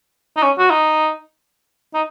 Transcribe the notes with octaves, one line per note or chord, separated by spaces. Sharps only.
D#4
C#4
F#4
D#4
D#4